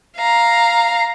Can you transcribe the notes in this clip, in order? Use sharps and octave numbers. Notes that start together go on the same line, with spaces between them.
F5 A#5